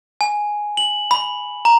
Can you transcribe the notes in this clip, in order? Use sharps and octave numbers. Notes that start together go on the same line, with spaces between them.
G#5
F#7
B5
A#5